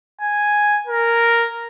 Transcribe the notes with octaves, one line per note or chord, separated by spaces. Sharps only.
G#5
A#4